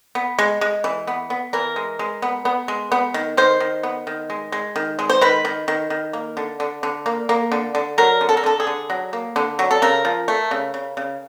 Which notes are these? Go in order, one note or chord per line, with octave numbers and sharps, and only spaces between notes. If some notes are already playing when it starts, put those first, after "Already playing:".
B3
G#3
G#3
E3
B3
B3
E3 A#4
G#3
G#3
B3
B3
G#3
B3
D#3
D#3 C5
D#3
B3
D#3
G#3
G#3
D#3
G#3
C5
D#3 B4
D#3
D#3
D#3
A#3
D3
D3
D3
A#3
A#3
D3
D3
F#3 A#4
D3
A4
A#4
D3 A4
G#4
D3
F#3
A#3
D3
F#3
A4
C#3 A#4
F3
A3
C#3
C#3
C#3